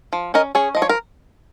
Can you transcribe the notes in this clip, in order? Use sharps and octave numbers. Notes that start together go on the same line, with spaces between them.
F3
C#4 A#4 D#5
C#4 G#4 C#5
F3 D#5
C#5
A#4